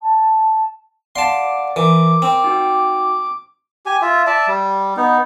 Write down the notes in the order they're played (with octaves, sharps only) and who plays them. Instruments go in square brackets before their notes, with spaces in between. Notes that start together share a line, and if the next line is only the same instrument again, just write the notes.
[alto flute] A5
[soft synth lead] D5 [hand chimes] F5 F#5 D7 [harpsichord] A5 C6
[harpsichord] E3 [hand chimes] A#4 [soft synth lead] D6
[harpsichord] C4
[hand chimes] D#4 F#4 G5
[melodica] G4 G#5
F4 E5
D5 E5 A5
G3
B3 D#4